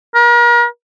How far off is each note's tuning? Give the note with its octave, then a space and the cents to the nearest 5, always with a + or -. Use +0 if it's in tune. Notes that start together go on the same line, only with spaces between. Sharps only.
A#4 +40